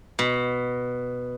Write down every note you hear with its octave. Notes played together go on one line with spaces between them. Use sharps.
B2